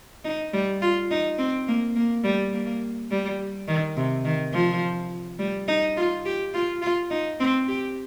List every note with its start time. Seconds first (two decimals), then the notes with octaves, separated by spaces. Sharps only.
0.24 D#4
0.53 G3
0.82 F4
1.11 D#4
1.38 C4
1.68 A#3
1.96 A#3
2.24 G3
2.53 A#3
3.11 G3
3.68 D#3
3.97 C3
4.25 D#3
4.53 F3
5.39 G3
5.68 D#4
5.97 F4
6.25 G4
6.54 F4
6.82 F4
7.10 D#4
7.40 C4
7.68 G4